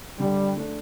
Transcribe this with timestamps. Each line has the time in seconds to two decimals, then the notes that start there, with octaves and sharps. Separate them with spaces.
0.19 D3 G3
0.56 A3 D4